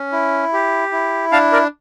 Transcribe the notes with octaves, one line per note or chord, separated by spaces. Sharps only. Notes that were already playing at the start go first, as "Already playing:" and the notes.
Already playing: C#4
E4
G4
E4
D4 F5 A5
A#4 D5